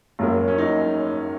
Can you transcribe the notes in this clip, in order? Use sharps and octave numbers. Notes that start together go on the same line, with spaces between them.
F#1 F#2 F#3 A#3
C#4
D#4